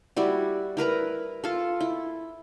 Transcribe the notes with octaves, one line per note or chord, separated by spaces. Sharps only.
G3 E4 F#4
E4 A#4 B4 A#5
F4 A4
E4